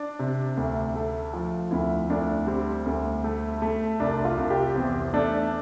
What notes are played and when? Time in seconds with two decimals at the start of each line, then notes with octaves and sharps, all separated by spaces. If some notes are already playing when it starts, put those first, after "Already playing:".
Already playing: D4
0.19 C3
0.57 D2
0.95 A3
1.33 F3
1.71 D2 E4
2.10 D2 D4
2.47 G3 C4
2.86 D2
3.24 A3
3.62 A3
4.00 C2 D4
4.25 F4
4.37 C2
4.50 G4
4.76 E2 C4
5.13 A3 D4